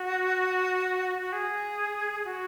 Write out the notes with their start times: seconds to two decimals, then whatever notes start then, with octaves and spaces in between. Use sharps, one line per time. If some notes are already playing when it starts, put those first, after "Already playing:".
Already playing: F#4
1.20 F#4
1.33 G#4
2.24 F#4